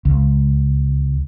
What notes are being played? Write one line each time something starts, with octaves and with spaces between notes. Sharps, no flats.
C#2